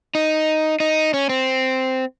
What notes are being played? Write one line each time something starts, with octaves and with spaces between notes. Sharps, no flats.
D#4
D#4
C#4
C4